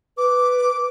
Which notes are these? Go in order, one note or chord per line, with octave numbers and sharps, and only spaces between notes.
B4 D6